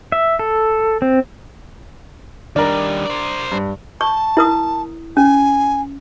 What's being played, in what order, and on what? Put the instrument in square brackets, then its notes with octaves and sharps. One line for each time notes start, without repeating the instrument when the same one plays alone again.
[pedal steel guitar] E5
A4
C4
[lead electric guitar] D#3 G3 [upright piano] D4 A#4
[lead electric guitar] C5 D5
[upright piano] G2
[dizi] A5 [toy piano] C#6
[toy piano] E4 A#4 D#6
[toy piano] C#4 [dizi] G#5